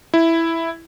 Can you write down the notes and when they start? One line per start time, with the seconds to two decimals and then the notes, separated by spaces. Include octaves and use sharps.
0.14 E4